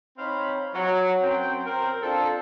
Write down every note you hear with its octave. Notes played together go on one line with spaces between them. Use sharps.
C4 D#4 C#5 F5 B5
F#3
F#2 C4 G5
C4 A#4
C4 D4 F4 A4